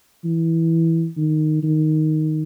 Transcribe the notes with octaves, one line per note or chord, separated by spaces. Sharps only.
E3
D#3
D#3